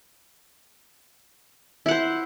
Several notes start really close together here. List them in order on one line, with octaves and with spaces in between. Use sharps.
E4 F#5 C5